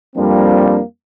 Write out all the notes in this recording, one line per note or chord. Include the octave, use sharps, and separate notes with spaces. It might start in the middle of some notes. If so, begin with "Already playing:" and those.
F2 F3 G3 A#3 C4 D4